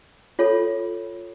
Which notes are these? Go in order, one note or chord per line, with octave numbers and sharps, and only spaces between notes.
F4 A4 C#5